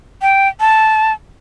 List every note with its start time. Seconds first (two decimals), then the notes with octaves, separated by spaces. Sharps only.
0.22 G5
0.60 A5